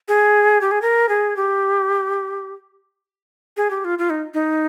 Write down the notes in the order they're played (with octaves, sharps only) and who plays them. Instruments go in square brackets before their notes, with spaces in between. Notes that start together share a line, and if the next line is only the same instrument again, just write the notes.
[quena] G#4
G4
G#4
A#4
G#4
G4
G#4
G4
F4
F4
D#4
D#4